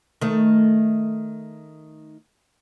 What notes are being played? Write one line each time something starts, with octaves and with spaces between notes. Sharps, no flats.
D#3 A3